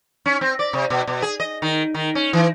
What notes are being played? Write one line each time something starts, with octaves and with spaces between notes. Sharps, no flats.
C#4
C4
D5
C3
B2
B2
G#4
D#5
D#3
D#3
C#4
E3